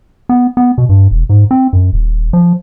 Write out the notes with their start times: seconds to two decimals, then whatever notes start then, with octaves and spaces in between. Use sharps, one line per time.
0.29 B3
0.57 B3
0.78 B2
0.89 G2
1.11 E1
1.29 G#2
1.51 C4
1.73 F#2
1.93 D#1
2.33 F3